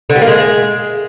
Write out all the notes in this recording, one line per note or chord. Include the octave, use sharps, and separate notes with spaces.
D3
G3
A#3
G#3